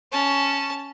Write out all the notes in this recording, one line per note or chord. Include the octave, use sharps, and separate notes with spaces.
C#4 A5